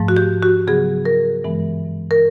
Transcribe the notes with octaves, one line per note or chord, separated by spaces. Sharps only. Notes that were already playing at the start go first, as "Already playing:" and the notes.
Already playing: G#2 F3 A3
F#4
G4
F#4
C#3 F#3 B3 G#4
A#4
G2 E3 G#3 B3
A#4